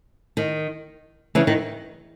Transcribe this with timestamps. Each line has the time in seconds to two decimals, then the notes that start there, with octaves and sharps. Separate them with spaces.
0.37 D#3
1.35 C#3 E3
1.47 D#3